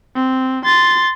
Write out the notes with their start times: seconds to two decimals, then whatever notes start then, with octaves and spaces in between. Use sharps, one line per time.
0.15 C4
0.65 C6 A6